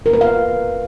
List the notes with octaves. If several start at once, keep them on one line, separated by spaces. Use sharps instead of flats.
A#4
B4
F5